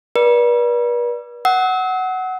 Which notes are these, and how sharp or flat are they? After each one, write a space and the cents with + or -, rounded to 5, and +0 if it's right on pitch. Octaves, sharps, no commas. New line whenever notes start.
B4 -45 D5 +0
F#5 +10 E6 -40